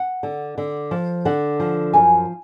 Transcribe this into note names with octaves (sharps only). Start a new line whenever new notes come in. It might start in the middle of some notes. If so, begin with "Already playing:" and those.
Already playing: F#5
D3
D3
F3
D3 F#5
F3
F#2 G#5